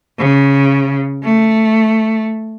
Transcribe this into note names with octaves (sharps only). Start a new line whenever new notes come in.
C#3
A3